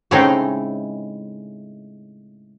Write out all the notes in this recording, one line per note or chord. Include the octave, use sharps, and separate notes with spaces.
A2 C#3 G#3 A3 C4 D#4